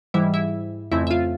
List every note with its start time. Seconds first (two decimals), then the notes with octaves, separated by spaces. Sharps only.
0.14 G#2 E3 G3 E4 E5
0.34 E4 E5
0.92 F2 C#3 E3 A3 C4 E4 E5
1.07 E5
1.11 F4 F5